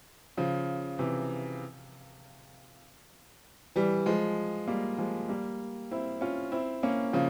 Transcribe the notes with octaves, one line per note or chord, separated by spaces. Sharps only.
C#3 F3
C3 E3
E3 G3
F3 G#3
G3 A#3
F3 G#3
G3 A#3
C4 E4
C#4 F4
C4 E4
A#3 C#4
C#3 F3